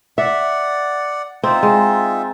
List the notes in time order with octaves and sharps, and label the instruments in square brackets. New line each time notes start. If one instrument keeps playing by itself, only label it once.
[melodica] D5 F#5 [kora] E5
[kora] C4 [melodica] D#4 F4 E5
[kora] G#3